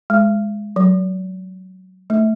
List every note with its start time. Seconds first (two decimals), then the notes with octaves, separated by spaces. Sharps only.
0.10 G#3
0.76 F#3
2.10 A3